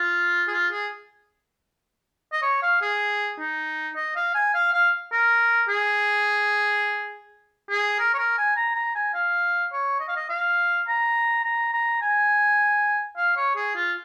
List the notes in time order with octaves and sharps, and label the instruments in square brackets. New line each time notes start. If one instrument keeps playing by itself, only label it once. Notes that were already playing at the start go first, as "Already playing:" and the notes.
Already playing: [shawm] F4
G#4
F4
G#4
D#5
C#5
F5
G#4
D#4
D#5
F5
G#5
F5
F5
A#4
G#4
G#4
A#4
C#5
A#4
G#5
A#5
A#5
G#5
F5
C#5
D#5
F5
D#5
F5
A#5
A#5
A#5
G#5
F5
C#5
G#4
F4